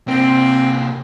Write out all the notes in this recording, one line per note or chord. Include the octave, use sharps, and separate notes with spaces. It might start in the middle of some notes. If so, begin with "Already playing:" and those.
C3 A#3 C4